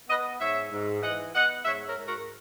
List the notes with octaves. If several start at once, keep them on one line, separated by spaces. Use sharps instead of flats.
B3 B4 D#5
G#2 C#5 E5
G#2
E3 D#5 F#5
B3 D#5 F#5
G#2 C#5 E5
A#4 C#5
G#2
F#4 A#4